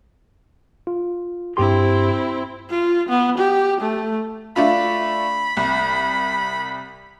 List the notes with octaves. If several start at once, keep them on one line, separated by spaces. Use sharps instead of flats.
F4
G2 C4 E4 G4 C6
F4
B3
G4
A3
A3 D4 F4 B5
C2